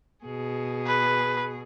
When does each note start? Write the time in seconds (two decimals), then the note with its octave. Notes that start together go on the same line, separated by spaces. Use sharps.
0.24 B2 G#4
0.87 B4